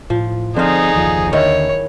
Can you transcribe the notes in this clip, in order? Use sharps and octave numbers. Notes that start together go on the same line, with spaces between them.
A2 F3
D3 F3 C4 D#4 G#4 C5 F5
F#1 D#2 F3
D#2 D3 D#3 E4 C#5